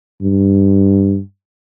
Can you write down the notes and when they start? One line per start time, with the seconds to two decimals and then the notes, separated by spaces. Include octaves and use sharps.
0.22 G2